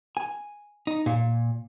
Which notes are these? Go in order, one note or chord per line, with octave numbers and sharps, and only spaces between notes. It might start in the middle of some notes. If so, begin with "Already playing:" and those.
G#5
D#4
A#2